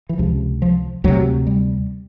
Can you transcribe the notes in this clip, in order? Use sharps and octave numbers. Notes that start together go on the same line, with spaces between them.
E3
C#2 C3 F3
F3
D2 C3 F#3
G3